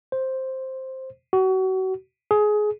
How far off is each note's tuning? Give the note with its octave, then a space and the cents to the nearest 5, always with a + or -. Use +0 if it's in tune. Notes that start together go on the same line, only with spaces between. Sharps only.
C5 +5
F#4 +30
G#4 +20